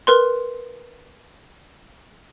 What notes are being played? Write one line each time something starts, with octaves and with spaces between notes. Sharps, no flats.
A#4 B4 C6